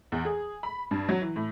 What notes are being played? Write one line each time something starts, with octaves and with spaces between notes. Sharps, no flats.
E2
G#4
B5
G2
F#3
E3
A2